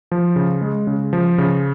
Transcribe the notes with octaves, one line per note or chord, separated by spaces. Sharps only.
F3
C#3
G#3
C#3
F3
C#3